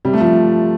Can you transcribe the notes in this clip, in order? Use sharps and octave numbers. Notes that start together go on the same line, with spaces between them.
C3 G3
A3
F3